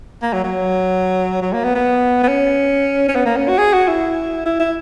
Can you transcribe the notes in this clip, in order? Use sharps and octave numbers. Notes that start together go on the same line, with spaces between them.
A#3
F#3
F#3
F#3
A#3
B3
B3
B3
C#4
C#4
B3
A#3
C#4
F#4
G#4
F#4
E4
E4
E4